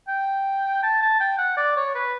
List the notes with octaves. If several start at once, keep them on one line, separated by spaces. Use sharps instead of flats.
G5
A5
A5
G5
F#5
D5
C#5
B4